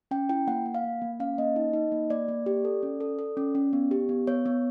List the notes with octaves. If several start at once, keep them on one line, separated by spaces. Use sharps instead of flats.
C#4 G5
E4 G5
A#3 F#5
A#3
F5
A#3
A#3
C#4 F5
A#3 D#5
D#4
D#4
A#3
A#3 D5
A#3
G4
A4
C#4
A4
A4
C#4
C#4
B3
G4
B3
B3 C#5
B3